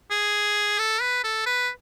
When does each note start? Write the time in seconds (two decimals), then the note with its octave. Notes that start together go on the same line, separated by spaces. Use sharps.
0.11 G#4
0.79 A4
1.01 B4
1.24 A4
1.46 B4